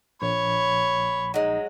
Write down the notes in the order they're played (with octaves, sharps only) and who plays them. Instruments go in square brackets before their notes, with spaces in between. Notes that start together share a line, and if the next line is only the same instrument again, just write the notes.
[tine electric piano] A#1 [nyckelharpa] C#5 [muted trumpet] B5
[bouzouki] F#3 G#3 [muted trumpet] D#4